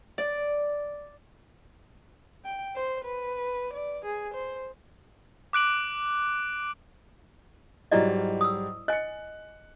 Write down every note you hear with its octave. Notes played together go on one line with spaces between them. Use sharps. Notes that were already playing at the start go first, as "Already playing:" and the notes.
D5
G5
C5
B4
D5
G#4
C5
D6 F#6 D7 F#7
G#2 F#3 G3 E4 D5 D#5
D#6 E6
D#5 G#5 F#6 C#7